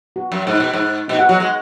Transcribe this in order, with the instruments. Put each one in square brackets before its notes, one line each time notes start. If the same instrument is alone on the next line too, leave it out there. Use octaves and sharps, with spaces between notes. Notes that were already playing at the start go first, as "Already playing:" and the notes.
[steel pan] F#4
[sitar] F#2
[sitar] G#2 [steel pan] D#4
[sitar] B2
G#2
[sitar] B2 [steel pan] D#4
[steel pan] F#4 F#5
[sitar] F#3 [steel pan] F#4 F#5
[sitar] G#3